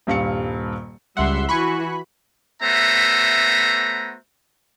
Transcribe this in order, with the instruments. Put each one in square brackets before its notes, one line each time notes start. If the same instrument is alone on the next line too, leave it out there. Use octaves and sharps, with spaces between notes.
[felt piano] D#1 G2 F5 C#7
[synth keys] C#2 F#5 [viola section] G3 E5 C6
[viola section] E3 F#4 [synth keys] G#5 C#6 F#6 [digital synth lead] B5
[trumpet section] A3 B3 F#4 C5 E5 A#5